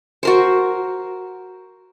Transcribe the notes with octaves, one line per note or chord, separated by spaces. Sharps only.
F#4 A#4 C5